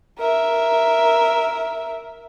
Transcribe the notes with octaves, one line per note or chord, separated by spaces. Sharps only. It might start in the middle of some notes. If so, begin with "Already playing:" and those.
A#4 E5